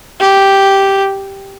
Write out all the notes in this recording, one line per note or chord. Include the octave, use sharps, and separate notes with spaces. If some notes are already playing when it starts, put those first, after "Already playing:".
G4